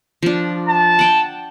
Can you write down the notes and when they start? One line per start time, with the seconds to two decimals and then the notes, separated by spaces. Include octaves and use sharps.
0.23 F3 D4
0.69 A5
0.99 F#5 G5